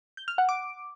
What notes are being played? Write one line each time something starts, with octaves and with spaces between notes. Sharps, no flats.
G6
F6
F#5
D6